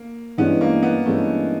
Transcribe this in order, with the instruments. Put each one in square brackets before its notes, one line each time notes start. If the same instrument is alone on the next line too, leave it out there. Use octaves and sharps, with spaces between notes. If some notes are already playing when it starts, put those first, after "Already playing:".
Already playing: [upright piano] A#3
[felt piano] G2 E3 G#3 C#4 [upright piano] B3
[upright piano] A#3
B3
[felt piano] G2 E3 G#3 C#4 [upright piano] A3